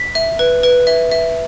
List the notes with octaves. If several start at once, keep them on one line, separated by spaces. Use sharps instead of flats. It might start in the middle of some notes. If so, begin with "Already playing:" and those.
Already playing: B6
E5
B4
B4
E5
E5